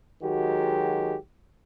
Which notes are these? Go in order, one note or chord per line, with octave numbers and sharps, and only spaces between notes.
D#3 F#3 G#3 F#4 G4